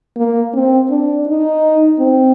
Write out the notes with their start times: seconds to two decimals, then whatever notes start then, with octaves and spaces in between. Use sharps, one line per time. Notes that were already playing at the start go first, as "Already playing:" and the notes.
0.17 A#3
0.54 C4
0.90 D4
1.27 D#4
1.99 C4